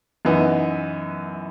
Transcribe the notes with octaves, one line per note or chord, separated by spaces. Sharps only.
F#2 E3 B3 D#4